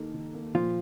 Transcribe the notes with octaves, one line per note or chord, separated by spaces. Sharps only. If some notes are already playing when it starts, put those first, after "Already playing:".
Already playing: D#3 A#3 D#4 A4
D#3
A#3
A#2 F3 F4